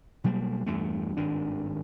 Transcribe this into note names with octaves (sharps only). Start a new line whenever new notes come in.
B2 F#3 G3 A#3
E2 G2 A#2 A3
G#1 G2 D#3 D4